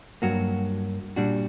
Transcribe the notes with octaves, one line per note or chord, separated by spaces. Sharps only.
G2 F#3 A#3 F#4
A#2 G3 D4 F#4